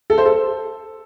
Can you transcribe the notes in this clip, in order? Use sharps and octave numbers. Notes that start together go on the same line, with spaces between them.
A4
C5
A4